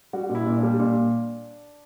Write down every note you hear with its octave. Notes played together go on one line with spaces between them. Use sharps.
G3 F#4
A#2
E4
A#2
D4
G3
A#2